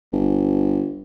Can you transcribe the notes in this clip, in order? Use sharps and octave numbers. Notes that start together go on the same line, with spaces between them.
G1